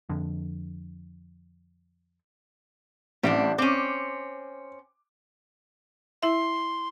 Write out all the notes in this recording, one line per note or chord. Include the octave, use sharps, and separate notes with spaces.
F2 D3
A1 G3 C4 D4
C4 C#4 D6
E4 E5 C6